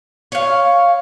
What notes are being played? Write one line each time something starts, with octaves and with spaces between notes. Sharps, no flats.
C#5 F5